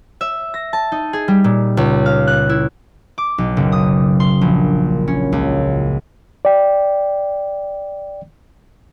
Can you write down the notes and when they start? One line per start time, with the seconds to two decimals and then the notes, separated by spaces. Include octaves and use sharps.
0.21 E5
0.54 A#6
0.73 A5
0.92 D#4
1.13 G#4
1.28 G3
1.44 A#2
1.77 C#2
2.06 F5
2.27 F#6
2.49 E4
3.18 D6
3.38 B1
3.57 F#1
3.72 D#6
4.20 C6
4.41 A#1
5.07 C#4
5.32 C#2
6.45 D5 G5